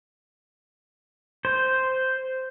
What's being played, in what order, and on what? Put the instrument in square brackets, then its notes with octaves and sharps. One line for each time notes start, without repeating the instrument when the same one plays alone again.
[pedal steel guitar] C5